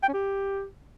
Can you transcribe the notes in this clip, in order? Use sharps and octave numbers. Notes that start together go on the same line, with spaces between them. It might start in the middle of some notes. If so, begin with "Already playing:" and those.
G5
C#4
G4